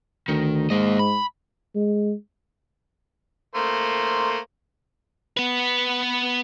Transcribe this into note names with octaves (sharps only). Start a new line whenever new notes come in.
D2 D#3
G#2 A#3 D#5
B5
G#3
A3 A#3 C5
B3 B4